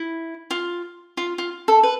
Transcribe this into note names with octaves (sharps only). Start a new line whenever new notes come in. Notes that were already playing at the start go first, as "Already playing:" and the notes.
Already playing: E4
F4
F4
F4
A4
B4